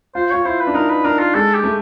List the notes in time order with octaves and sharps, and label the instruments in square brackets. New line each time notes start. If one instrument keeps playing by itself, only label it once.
[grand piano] F4 [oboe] C5
[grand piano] F4 [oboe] C#5
[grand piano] E4 [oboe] C5
[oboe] B4
[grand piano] D4
[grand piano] D#4 [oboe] A#4
[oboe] B4
[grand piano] D4 [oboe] A#4
[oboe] F4
[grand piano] G#3 [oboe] A4
[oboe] G4
[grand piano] A3